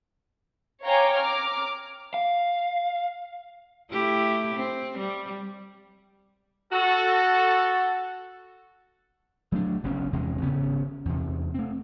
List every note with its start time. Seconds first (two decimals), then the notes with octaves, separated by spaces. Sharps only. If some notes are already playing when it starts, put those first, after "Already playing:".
0.85 C#5 F5 G5 G#5 A#5 D6
1.17 A#5 D6 F6
2.14 F5
3.91 A3 E4 G4
4.55 C4
4.98 G3
6.72 F#4 A4
9.52 F#3 A3 D4
9.83 F#1 B1 F#2 C#4
10.13 F1 E2 C3 G#3
10.41 G#1 C#3 B3 C#4
11.05 E2 C3
11.54 A3 C4